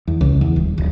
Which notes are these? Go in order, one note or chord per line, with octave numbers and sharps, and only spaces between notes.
E2
C#2
E2
D#1
D1